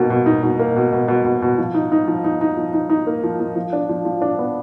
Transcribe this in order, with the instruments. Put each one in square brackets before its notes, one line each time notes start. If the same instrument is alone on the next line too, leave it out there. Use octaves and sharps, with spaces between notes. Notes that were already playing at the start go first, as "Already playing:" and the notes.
Already playing: [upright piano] B2 A#3 D#4
B2
D#4
B2
A#3
B2
B2
B2
B2
B2
F3
D#4
D#4
F3
D#4
D#4
F3
D#4
D#4
A#3
F3
F3
F3
D4
F3
F3
D4
B3